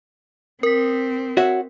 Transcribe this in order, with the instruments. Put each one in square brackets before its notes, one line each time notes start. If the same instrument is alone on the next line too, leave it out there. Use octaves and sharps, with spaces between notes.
[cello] C4 [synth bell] A#4 B6
[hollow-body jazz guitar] F#4 C#5 E5